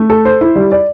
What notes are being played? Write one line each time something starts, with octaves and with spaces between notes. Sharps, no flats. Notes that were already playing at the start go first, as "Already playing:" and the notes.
Already playing: A3
A4
C5
E4
G3
D5